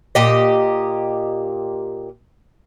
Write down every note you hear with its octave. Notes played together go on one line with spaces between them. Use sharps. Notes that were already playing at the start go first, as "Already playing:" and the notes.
A#2 G4 D#5